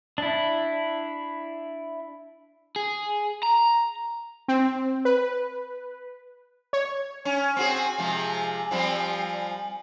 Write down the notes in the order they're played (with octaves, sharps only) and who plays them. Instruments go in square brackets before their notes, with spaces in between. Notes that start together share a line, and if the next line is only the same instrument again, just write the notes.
[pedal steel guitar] D4 E4
[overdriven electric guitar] G#4
A#5
[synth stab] C4
B4
C#5
[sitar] C#4 [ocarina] G#5
[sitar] C4 F#4 G#4
C3 F3 G#3
F3 G3 C4